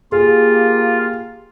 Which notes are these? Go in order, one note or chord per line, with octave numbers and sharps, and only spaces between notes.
A#3 F4 G4 G#4